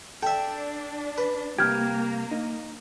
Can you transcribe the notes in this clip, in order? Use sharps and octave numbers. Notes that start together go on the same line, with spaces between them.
D4 A4 E5 G5
B4
C3 G3 A#3 G4 F6 G6 G#6
D#4